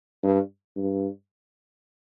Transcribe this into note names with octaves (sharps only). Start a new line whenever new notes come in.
G2
G2